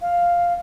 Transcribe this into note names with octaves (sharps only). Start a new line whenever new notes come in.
F5